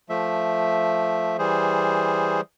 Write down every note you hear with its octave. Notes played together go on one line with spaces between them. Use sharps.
F3 A3 E5
E3 G3 G#4 C5